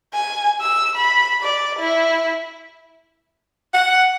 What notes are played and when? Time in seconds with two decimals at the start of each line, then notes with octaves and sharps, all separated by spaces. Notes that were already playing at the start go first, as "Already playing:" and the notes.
0.14 G#5
0.61 E6
0.95 B5
1.42 D5
1.79 E4
3.74 F#5